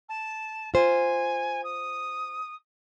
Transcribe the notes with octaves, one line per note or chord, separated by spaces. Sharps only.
A5
F4 C5 G#5
D#6